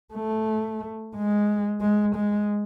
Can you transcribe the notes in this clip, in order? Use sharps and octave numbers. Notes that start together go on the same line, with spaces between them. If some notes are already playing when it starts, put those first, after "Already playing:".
A3
G#3
G#3
G#3